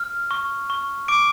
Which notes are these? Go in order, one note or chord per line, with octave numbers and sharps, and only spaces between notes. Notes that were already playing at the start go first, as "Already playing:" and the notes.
Already playing: F6
C#6
C#6
D6 D7